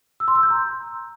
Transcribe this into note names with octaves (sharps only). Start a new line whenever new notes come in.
E6
C6
E6
G6
A#5